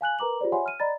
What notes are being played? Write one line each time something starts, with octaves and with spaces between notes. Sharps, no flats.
F5 G#5 F#6 F#7
A#4 B4 A#5 D6 F#7
F4 G4 G#4 C5 D5
C#5 E5 F#5 G#5 B5 C6
F6 D#7
D5 D#5 A#5 B5 A6